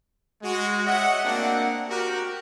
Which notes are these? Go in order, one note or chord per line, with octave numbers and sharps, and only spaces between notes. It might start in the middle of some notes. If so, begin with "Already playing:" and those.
G#3 F#4
C#5 D#5 E5 F#5
A3 A#3 C4 D4 F#4 F#5
F#4 G4 A#4